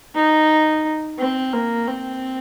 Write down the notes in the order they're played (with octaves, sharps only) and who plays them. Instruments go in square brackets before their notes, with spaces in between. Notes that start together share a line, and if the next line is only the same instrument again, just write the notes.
[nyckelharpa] D#4
C4
A#3
C4